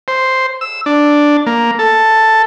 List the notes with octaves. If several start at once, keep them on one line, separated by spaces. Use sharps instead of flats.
C5
E6
D4
A#3
A4